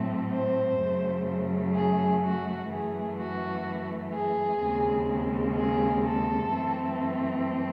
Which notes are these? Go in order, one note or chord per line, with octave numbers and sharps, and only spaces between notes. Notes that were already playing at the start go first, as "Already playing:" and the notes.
Already playing: A2 F#3 A3 C4
C5
F#2 C#3 F#3 A3
G#4
F#4
F#2 E3 A3 G#4
F#4
G#4
D#2 C#3 G#3 C4
G#4
A4
F#2 E3 A3 C4